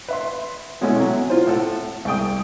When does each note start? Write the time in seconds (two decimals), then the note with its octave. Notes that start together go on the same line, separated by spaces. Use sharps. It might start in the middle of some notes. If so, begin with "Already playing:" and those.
0.08 B4 E5 C6
0.81 B2 G#3 A3 B3 C#4 E4
0.96 C3 F#3
1.30 F4 C5
1.47 A2 A4 F#5
2.05 C2 G#4 G5 D#6